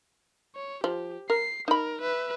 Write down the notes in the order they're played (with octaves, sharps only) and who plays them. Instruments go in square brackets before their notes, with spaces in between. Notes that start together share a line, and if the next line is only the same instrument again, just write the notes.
[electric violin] C#5
[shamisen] F3 [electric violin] G4
[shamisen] A#4 [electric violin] C7
[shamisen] D#4 B5 [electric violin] A#4
[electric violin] B4 E5